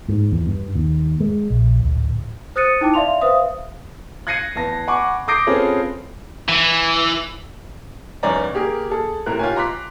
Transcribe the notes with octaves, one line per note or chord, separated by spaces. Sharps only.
G#2
E2
G2
D#2
G#3
A#1
D1
C5 D#6 F#6 A6 C#7 D#7
D#4 E4 G5 A5 D6
D5 E5 F5 C6 F7
B4 C5 E5 F5 D#6
F#6 G#6 A#6 C7 C#7 D#7
E2 B3 A5 A#6
F#5 G#5 B5 C#6 D6
D6 D#6 G6 A#6 C7 D7
C4 C#4 F4 G#4 A4 B4
E3
F1 C2 C#4 D5 G#5 A#5
A#3 G4 G#4 A#4
G#4 A4
A2 C3 A#4 F#6
F4 G4 C#5 G#5
A#5 C6 D6 F#6 B6